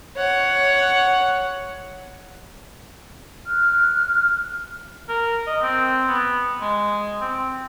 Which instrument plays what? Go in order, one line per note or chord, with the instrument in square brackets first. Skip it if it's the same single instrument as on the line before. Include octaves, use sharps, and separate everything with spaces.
[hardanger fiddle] C#5 F#5
[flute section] F6 F#6
[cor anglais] A#4
D#5
C4
B3
G#3
C4